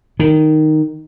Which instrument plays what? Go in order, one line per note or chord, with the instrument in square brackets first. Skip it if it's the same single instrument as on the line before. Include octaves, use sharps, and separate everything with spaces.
[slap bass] D#3